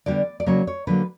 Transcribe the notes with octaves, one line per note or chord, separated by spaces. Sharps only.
D3 G3 B3 D5
D5
C#3 F#3 A#3 C#5
C#5
D3 F#3 A#3 B4